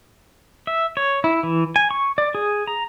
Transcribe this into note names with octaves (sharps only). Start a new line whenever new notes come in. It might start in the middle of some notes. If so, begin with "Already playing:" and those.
E5
C#5
E4
E3
G#5
C#6
D5
G#4
A#5